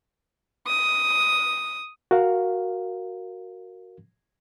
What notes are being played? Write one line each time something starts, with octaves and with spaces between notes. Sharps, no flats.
D#6
F#4 A#4 F5